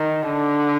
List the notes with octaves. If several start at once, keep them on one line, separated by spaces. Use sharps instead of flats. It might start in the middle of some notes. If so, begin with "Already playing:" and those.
Already playing: D#3
D3